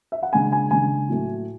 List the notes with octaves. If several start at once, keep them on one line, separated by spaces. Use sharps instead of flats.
E5
F#5
C#3 G#3 D4 G#5
G#5
C#3 G#3 D4 G#5
A2 F#3 A3